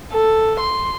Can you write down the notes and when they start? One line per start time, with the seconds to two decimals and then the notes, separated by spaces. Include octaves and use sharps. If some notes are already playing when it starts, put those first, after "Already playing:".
0.13 A4
0.60 C6